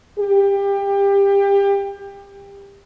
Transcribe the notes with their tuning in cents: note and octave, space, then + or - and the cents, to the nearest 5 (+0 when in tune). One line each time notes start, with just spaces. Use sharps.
G4 +25